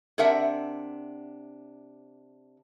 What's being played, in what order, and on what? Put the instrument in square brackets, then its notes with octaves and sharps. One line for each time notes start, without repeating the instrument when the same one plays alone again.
[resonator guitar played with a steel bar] C3 D4 A#4 E5 F#5